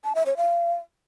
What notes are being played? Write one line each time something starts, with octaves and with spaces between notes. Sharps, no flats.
A5
E5
C#5
F5